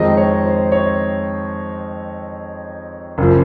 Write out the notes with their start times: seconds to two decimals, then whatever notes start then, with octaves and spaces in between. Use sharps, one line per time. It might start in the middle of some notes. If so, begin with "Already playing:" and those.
Already playing: F2 D#3 G#3 C4 D#5
0.17 C#5
0.45 C5
0.72 C#5
3.18 F#1 F3